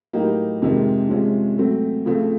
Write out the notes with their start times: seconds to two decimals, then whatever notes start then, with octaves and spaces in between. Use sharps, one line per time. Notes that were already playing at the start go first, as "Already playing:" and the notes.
0.13 A2 F#3 A#3 D#4 G4
0.62 F2 C3 D#3 G#3
1.09 C3 F3 G#3 C#4
1.58 F#3 A3 C4
2.05 C#3 F3 A3 C4 F4